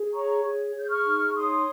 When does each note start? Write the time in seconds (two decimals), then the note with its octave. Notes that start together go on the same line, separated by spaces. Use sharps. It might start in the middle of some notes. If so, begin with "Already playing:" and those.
Already playing: G#4
0.14 C#5 A#5 C#6
0.44 G#4
0.75 G#4 G6
0.90 C#6 F6
1.05 D#4
1.35 C#5 C6 D#6